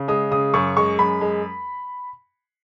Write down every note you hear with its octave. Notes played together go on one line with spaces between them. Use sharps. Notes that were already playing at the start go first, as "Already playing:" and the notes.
Already playing: C#3
G#3 D#6
C#3 D#6
F#2 C#6
G#3 C#6
F#2 B5
G#3